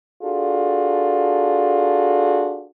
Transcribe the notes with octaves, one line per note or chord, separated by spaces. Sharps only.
D4 F4 F#4 G#4 A4